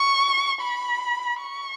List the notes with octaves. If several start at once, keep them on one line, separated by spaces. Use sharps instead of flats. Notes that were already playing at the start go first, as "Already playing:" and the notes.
Already playing: C#6
B5
C#6